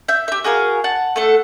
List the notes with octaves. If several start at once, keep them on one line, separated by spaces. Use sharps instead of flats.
E5 G6
G4 E5
F#4 G#4 A#4 F5
F#5 A5
A3 A4 F#5